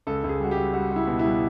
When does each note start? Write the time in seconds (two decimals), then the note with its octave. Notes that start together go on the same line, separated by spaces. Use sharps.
0.07 C#2 A4
0.24 C#2
0.29 G#4
0.40 G3 F#4
0.51 G4
0.57 G3
0.73 G3 F#4
0.91 G3
0.96 E4
1.08 B2
1.19 E4
1.25 G3